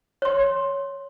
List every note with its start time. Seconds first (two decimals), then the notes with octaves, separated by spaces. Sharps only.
0.22 C#5 C6